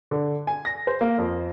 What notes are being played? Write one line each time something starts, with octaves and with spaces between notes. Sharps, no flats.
D3
G#5
A#6
C5
A#3
F2